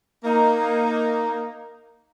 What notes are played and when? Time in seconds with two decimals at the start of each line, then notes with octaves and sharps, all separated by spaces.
0.24 A#3 D#4